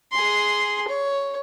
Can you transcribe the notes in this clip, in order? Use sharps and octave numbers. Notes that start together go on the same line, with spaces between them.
G#4 C6
C#5